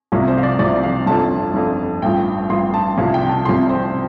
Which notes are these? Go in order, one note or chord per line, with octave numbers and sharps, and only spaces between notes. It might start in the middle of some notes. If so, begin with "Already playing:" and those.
C2 C3 F3
C5
F5
D5
C2 C3 F3 D5
F5
G1 F2 F3 A5
G1 F2 F3
A1 G2 F3 G5
A1 G2 F3 C6
A5
C2 C3 F3 F5
G5
A5
C2 C3 F3 C6
C5